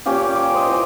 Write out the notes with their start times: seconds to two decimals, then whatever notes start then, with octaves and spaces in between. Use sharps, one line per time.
0.06 A#2 C#4 G4 F5
0.36 D6
0.54 C5 D#5
0.68 E3 F4